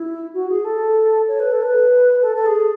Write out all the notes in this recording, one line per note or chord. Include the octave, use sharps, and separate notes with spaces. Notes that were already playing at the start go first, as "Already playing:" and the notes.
Already playing: E4
F#4
G#4
A4
C#5
B4
A4
B4
A4
A4
G#4